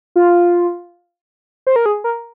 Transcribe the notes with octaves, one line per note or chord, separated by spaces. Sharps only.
F4
C5
A#4
G#4
A#4